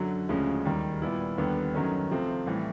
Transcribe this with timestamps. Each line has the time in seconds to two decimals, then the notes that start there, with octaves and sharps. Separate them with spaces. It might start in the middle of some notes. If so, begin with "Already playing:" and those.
Already playing: F#2 D3 F#3
0.29 D2 C#3 F3 G#3 C#4
0.65 D#2 D#3 G3
1.02 A#2 G3 B3 E4
1.38 D#2 D3 G3 B3
1.74 F#2 D#3 F#3 A3 C#4
2.11 C3 F3 A3 C4
2.46 A2 E3 G3